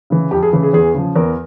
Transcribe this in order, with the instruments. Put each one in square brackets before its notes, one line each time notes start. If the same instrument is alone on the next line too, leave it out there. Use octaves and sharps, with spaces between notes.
[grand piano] C#3 E3
F2 G4
G#4
C#3 E3
G#4
E2 G#4
C#3 F3
E2 A#4